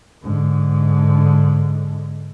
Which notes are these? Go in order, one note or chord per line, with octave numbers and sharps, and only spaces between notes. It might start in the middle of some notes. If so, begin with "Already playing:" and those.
G#2 D3